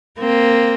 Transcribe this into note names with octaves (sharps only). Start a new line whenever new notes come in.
A#3 C4